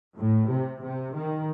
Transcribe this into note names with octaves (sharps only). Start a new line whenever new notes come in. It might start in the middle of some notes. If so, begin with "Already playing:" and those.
A2
C3
C3
D#3